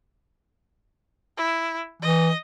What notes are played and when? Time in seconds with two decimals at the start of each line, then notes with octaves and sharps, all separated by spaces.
1.38 E4
2.02 E3 D#5